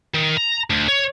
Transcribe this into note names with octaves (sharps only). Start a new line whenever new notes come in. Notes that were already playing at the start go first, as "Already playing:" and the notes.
D#3
A#5
D2
C#5